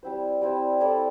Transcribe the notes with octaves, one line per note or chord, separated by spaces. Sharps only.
G3 C4 E4 C5
G3 C4 E4 C5
E4 A4 D5